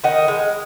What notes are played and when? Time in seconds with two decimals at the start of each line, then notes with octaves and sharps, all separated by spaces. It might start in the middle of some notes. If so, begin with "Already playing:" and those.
0.04 D#3 D#5 F#5
0.28 G#3